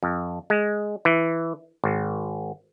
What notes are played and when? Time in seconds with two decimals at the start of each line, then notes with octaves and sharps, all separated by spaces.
0.03 F2
0.50 G#3
1.05 E3
1.84 G#1